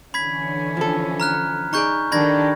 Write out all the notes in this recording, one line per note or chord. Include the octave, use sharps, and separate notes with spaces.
D3 E3 C#4 B5 G#6 B6
F3 A4
A#5 F6 F#6
D#4 G#4 D5 A#5 C#6 G6
D#3 D4 G4 A4 B5 G#6 A#6